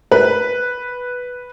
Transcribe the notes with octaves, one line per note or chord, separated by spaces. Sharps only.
B4